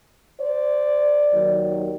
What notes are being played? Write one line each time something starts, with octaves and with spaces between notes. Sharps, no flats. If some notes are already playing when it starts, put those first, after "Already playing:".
C5 D5
D#2 D#3 F#3